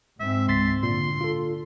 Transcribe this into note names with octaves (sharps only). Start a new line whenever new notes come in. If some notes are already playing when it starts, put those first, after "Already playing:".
G#2 G#3 C4 E5
C#2 C6 A6 B6
A#2 D3 C6
F4 A4